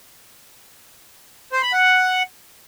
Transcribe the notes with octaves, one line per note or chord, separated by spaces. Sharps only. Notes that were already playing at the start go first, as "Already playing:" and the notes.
C5
B5
F#5